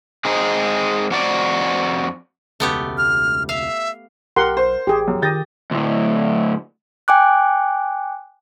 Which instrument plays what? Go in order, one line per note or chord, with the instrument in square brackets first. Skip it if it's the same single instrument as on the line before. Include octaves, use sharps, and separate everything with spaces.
[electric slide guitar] G#3 C4 D#4 G#4
F2 F#4 D5
[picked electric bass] E1 C#2 [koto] A3 B3 G4
[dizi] F6
[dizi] E5 [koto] F5
[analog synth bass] B1 [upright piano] G4 [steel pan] A#4 F#5 C6
[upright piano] C5
[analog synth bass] A1 [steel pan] G4 G#4
[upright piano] F#2
[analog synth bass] D#3 [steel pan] G4 D#6 [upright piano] G6 A6 A#6
[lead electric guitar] D2 A2
[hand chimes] G5 G#5 D6 F#6